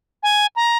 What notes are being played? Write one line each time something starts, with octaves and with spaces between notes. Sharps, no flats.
G#5
A#5